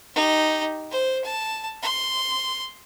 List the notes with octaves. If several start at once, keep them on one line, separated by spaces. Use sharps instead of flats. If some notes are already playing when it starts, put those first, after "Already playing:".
D#4 G4
C5
A5
C6